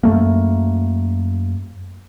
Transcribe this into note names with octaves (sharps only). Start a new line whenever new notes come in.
F#2 A3 A#3